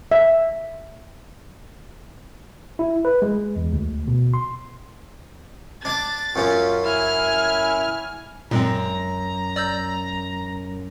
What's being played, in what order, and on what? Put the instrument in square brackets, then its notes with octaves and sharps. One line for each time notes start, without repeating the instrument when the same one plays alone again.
[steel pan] E5
[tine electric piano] E4
B4
G#3
E2
D2
B2
C6
[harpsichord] D4 D6 [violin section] A6
[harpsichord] F#2 C#4 [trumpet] F4
[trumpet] E4 [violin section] G#5 [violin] F6
[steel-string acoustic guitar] F#2 [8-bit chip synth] A#2 G#3 C4 [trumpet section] A#5
[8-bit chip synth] D5 E6 G6